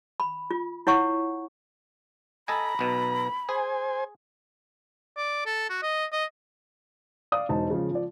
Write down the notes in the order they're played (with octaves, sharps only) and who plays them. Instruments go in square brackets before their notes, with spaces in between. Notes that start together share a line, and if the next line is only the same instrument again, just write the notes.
[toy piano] B5
F4
E4 C#5 F#5 C#6
[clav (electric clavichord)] A4 D#5 G#5 [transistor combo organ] A#5 [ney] B5
[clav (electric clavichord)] B1 B2
[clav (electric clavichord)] G#4 [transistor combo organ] C5 G#5
[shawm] D5
A4
F#4
D#5
D#5
[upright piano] D5 F5 D#6
E1 D#4 C5 D#5 A5
C#3 F3 G#3
F3 D5